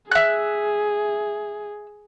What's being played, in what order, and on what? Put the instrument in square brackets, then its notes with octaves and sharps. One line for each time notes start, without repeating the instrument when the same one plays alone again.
[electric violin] G#4 [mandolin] E5 F#6